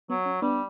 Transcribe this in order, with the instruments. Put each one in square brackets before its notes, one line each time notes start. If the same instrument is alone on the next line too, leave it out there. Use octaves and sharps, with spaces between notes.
[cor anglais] F#3 [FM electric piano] B3
[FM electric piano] C#4
[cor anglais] G3 [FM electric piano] B3 D4